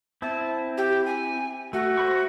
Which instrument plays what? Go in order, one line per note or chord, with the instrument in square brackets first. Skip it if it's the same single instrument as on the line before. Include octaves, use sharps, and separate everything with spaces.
[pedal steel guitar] C4 E4 [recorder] A5
[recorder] G4
G#5
[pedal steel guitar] A3 [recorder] F#4
[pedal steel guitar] C5 B5 C#6